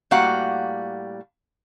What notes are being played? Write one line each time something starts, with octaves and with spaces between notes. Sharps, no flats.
A2 G3 A#3 F#4 F5 F#5